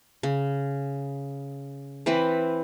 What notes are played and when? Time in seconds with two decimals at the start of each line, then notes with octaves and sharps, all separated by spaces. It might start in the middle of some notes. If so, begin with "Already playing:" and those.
0.23 C#3
2.06 E3 C4 B4 B5